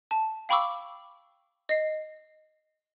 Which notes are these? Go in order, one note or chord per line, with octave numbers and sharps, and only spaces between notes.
A5
F5 G5 B5 C#6 D6 E6
D#5 C7